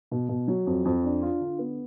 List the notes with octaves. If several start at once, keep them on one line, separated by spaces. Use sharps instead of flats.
B2
B2
F#3
F2
F2
D4
F4
D3
B3